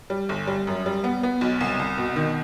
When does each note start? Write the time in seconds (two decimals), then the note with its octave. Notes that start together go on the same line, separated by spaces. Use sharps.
0.10 G3
0.29 G1
0.47 G3
0.67 F#2
0.86 G3
1.04 B3
1.23 B3
1.41 B1
1.61 C2
1.79 C2
1.98 B2
2.16 D#3